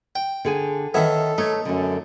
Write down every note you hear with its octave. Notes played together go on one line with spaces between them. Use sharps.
G5
D3 G#4 G#5
D#3 B3 A4 C#5 E5
A3 D#4 C#5
F#2 D3 A3